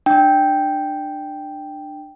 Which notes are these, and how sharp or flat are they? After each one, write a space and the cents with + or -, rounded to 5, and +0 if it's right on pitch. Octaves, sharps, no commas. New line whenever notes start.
D4 +25 G5 +0